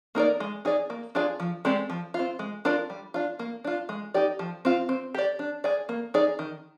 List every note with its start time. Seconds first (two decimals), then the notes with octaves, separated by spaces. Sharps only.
0.15 A#3 D#4 A#4 D5
0.40 G#3
0.65 D#4 G#4 D5
0.90 A#3
1.15 D4 F4 G#4 D5
1.40 F3
1.65 G#3 C4 G4 D5
1.90 F3
2.14 C4 F4
2.39 G#3
2.65 D4 F4 A#4 D5
2.90 G3
3.14 D4 F4
3.39 A#3
3.64 D4 F4
3.89 G#3
4.14 D#4 G4 D5
4.39 F3
4.65 C4 F4
4.89 C4
5.15 G4 D5
5.39 D4
5.64 G#4 D5
5.89 A#3
6.14 D#4 G#4 D5
6.39 D#3